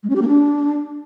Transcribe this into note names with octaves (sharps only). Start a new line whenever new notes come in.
G#3
C#4
G4
A#3
D4